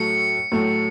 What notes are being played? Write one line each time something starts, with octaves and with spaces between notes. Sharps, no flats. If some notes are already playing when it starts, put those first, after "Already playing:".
Already playing: A2 F#3 A3 C#7
A2 F#3 A3